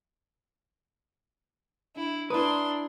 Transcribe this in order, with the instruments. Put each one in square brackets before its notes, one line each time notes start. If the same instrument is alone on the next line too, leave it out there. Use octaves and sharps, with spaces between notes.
[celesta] D4 [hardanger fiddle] E4
[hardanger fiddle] D4 C6 [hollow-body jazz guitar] E4 B4 [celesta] D5 A#5 D#6